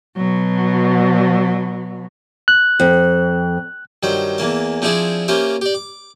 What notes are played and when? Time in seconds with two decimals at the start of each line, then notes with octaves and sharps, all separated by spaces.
0.17 B2 F#3
2.48 F#6
2.80 F2
4.03 G2 D#3 F#3 C5 G5
4.38 E2 E3 A#3 A5
4.82 F3 C4 D4 E4 G#4 D5
5.28 A#3 C#4 F4 G4 C5 E5
5.62 G4 D5
5.74 D6